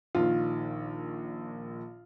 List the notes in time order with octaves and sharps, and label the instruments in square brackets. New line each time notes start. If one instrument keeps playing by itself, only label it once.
[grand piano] A#1 A#2 D#3 [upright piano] F4